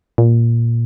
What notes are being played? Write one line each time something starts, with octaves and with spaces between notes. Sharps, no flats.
A#2